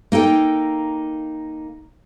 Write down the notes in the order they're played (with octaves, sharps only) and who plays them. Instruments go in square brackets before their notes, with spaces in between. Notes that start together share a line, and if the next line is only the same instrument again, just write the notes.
[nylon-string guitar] A#3 D#4 A4 G5